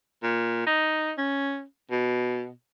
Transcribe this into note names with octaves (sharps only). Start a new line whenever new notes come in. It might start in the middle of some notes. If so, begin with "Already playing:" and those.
A#2
D#4
C#4
B2